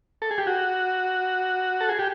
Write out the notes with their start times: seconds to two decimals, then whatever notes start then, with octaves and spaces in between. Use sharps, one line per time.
0.22 A4
0.31 G#4
0.38 G4
0.47 F#4
1.81 A4
1.89 G#4
1.99 G4